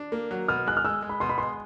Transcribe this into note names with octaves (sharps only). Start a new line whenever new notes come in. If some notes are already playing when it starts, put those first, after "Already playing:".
Already playing: D4
A#3
F#3
B2 F6
G#3 F#6
F6
G#3 E6
G#3
B5
B2 C6
B5
G#3 C6